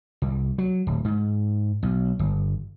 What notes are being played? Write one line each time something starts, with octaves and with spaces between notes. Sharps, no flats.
C2
F#3
D1
G#2
B1
G1